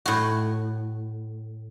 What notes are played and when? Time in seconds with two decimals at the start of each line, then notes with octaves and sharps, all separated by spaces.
0.06 A2 F#4